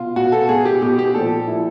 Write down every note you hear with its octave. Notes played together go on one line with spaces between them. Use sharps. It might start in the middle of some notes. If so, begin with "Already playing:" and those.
Already playing: B2 F4
B2 F#4
A4
B2 G#4
G4
B2 G4
G4
A#2 F3 A4
A#2 F3 E4